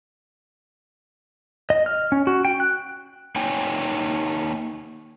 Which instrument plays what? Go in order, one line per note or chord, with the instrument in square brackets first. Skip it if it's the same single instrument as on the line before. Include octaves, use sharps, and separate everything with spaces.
[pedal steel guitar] D#5
F6
C#4
F#4
G5
F#6
[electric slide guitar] A#3 D#4 C#5 G5 G#5